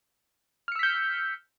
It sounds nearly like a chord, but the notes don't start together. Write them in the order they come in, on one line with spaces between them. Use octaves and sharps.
F6 C#7 E6 B6 G6